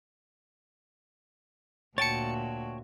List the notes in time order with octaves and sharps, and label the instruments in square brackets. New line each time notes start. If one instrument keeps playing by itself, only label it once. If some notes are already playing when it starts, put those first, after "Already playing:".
[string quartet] D2 A#2 F#4 [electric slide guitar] C#5 G5 A5 [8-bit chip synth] A6 C#7